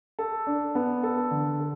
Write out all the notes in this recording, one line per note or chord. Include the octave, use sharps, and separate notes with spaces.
A4
D4
B3
A4
D3
A4